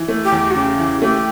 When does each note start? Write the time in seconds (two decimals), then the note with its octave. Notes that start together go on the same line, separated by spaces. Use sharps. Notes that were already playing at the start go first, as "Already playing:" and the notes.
Already playing: E3
0.08 A3
0.24 G4
0.32 E2
0.51 F#4
0.55 C#3 G4
0.78 E3
1.02 A3 G4